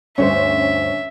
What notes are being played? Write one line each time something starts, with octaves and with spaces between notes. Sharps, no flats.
D2 G2 C#4 C5 E5